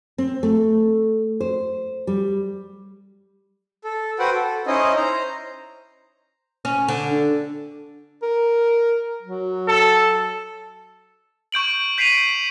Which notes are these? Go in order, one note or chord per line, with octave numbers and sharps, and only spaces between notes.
C4
A3
C5
G3
A4
F#4 B4 C5 F#5 G5
A4
C#4 D#4 E4 C5 D#5
C5 A#5
C#4
D3
D4
A#4
F#3
A4
C#6 G6 D7 F#7
G6 B6 C7 D7 D#7 F7